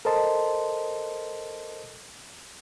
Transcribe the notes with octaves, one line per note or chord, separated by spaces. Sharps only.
A4 A#4 C5 D#5 A5 C6